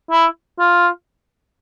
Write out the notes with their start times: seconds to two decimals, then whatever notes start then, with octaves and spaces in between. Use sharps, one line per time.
0.11 E4
0.59 F4